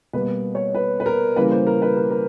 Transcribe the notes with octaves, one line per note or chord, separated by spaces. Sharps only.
B2 G3 A#3 B4
C#5
B4
B4
A#4
C#3 E3 G3 A#3 B4
C5
A#4
B4
A#4
A#4